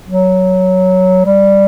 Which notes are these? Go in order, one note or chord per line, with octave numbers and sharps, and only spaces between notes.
F#3
G3